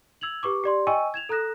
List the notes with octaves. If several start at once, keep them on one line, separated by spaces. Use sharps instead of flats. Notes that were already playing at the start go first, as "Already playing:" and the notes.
E6 G#6 F7 F#7
G4 B4 C#6 D6
G4 D5 C6
D#5 G5 G#5 C#6 E6 D#7
G#6 E7 F7
A4 A#5 D#6 F#6 A#6 E7